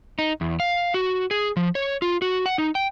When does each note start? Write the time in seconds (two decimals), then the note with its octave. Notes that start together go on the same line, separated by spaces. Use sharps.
0.19 D#4
0.41 E2
0.60 F5
0.94 F#4
1.31 G#4
1.56 F3
1.75 C#5
2.02 F4
2.22 F#4
2.46 F#5
2.58 D#4
2.75 G5